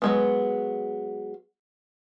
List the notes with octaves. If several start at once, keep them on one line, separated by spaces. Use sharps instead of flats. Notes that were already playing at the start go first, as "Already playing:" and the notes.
F#3 G#3 B3